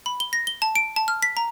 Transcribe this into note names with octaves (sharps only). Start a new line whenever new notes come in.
B5
G7
A#6
G7
A5
D7
A5
F6
B6
A#5